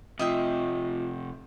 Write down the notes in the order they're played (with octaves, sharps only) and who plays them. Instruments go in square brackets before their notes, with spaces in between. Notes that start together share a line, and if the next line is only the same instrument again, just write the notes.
[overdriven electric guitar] C3 F3 [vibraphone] F4 [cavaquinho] D#5 E5 G5